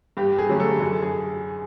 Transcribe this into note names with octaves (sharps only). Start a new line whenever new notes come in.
G2 G4
G#4
D3 F#3 A3 C#4
A4
F#2
G#4